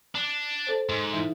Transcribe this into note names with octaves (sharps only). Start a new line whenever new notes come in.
D4
A4 C5
G#2
E3 D#4 E4